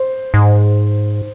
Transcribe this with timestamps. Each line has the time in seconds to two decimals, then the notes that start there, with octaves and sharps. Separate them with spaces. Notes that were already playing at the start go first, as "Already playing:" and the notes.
Already playing: C5
0.34 G#2